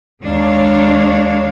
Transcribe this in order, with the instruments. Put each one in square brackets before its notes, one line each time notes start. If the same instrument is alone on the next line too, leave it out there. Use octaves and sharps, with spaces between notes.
[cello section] D#2 G#3 D4 C#5 F5